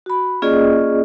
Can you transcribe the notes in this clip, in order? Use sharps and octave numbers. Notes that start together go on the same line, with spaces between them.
F#4 B5
A#3 C#4 F4 G#4 D5 D#5